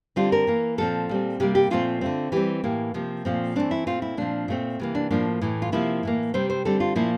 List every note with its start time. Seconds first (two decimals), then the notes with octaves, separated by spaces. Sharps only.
0.16 D3 G3 C4 F4
0.32 A#4
0.47 E3 A#3
0.78 A#2 F3 C4 A4
1.09 A#2 G3 C4
1.40 C3 G3 A#3 G4
1.55 G4
1.70 A#2 F3 A3 C4 F4
2.01 D3 A3 C4
2.32 E3 G3 C4 G4
2.64 A2 E3 A#3
2.94 C3 F3 A#3
3.25 A#2 F3 A3 C4
3.56 E3 A3 C4 D4
3.71 E4
3.87 A#2 A3 C4 F4
4.02 E4
4.17 A#2 F3 C4 D4
4.48 A#2 A3 C4
4.80 C3 E3 A#3
4.95 D4
5.11 A2 F3 A#3 D4
5.42 A2 E3 A3
5.62 F4
5.72 C3 F3 A#3 E4
6.03 A2 E3 A#3
6.34 C3 G3 C4 C5
6.50 C5
6.65 D3 G3 C4 A4
6.80 F4
6.96 A#2 F3 A#3 E4